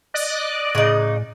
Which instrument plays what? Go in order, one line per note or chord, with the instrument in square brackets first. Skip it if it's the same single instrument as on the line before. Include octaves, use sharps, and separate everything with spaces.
[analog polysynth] D5 D#5 F#6
[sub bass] A2 [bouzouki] C#3 D#4